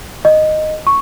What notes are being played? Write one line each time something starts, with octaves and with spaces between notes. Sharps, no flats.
D#5
C#6